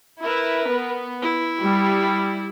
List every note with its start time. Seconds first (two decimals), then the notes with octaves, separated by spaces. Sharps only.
0.23 E4 A#4 B4
0.69 B3
1.22 E4
1.62 G3